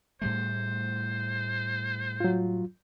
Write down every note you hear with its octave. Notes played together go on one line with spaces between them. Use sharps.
A2 G3 A3 C5
F#3 F4